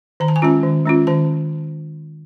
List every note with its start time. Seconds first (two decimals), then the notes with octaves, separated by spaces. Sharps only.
0.20 D#3 A#5
0.28 A5
0.36 G#5
0.42 G#3 C#4 F4 A5
0.63 D#3
0.86 G#3 C#4 F4
1.07 D#3 A5